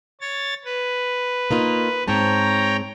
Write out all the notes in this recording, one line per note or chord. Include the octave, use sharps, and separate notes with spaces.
C#5 A6
B4
A#3 D#4 F4
G#2 C4 C#5 G5 A5 A#5